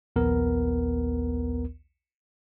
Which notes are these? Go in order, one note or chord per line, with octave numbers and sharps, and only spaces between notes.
A#1 D#2 B3 A#4